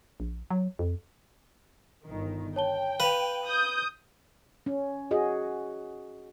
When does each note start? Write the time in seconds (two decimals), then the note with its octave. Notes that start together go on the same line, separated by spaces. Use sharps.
0.20 A#1
0.51 F#3
0.79 F2
2.05 G1 D#3
2.56 C#5 G5 A5 G7
3.00 B4 F5 D#7 F7
3.45 D#6 G6
4.66 C#4
5.11 F#4 G#4 D#5